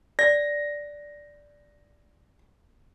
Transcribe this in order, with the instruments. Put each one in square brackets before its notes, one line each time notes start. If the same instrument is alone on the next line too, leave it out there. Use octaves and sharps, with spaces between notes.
[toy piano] D5 [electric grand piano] A#6